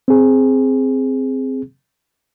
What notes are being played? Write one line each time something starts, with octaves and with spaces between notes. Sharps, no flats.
C4 G#4